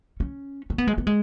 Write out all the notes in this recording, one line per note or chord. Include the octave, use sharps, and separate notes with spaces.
C#4
C#4
B3
G#3
B3
G#3